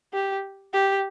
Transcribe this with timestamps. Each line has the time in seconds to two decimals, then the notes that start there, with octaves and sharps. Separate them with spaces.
0.13 G4
0.74 G4